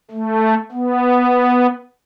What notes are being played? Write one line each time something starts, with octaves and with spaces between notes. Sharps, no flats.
A3
B3